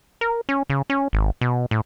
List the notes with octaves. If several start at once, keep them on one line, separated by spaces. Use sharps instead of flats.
A#4
C#4
C#3
C#4
G#1
B2
A2